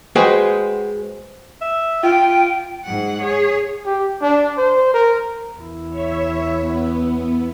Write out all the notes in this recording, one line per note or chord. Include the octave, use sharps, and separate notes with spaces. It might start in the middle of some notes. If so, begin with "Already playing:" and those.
G#3 F#4 G#4 B4 C5 G5
E5
F4 G5
G#2 F#5
G#4 C#5
G4
D4
C5
A#4
E2 E4
C#5 E5
B3